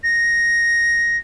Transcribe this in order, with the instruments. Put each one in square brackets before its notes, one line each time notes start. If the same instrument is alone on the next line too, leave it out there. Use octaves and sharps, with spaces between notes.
[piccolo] A#6